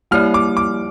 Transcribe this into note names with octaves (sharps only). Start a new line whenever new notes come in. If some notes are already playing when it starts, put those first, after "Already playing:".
G3 A#3 E4 G4 D5 F6
D6
D6